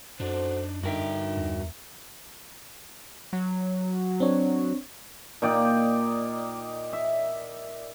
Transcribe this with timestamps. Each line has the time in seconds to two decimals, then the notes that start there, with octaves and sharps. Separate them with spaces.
0.20 F#2 D4 D#4 F#4 A4 C5
0.83 G2 D3 D#4 F#4 A#4 E5 G5
1.37 E2
3.33 F#3
4.20 C4 D4 C#5
5.42 A#2 D#4 D5 G5
6.93 E5